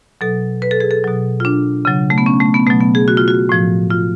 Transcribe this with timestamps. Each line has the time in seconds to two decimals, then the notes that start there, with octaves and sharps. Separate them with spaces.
0.21 B2 F#3 A4
0.62 B4
0.71 A4
0.80 G#4
0.91 A4
1.04 B2 F#3
1.40 F4
1.45 D4
1.85 C#3 F#3
2.10 A3
2.18 B3
2.26 C#4
2.40 A3
2.54 B3
2.67 B2 F#3 A3
2.80 B3
2.95 G#4
3.08 F#4
3.17 F4
3.28 F#4
3.49 A2 F3
3.90 F4